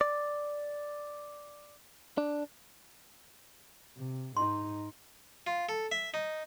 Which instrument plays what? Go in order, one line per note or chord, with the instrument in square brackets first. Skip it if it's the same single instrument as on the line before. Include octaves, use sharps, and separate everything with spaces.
[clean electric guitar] D5
D4
[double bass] C3
[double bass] G#2 D#4 [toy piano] C6
[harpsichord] F4
A4
E5
D#4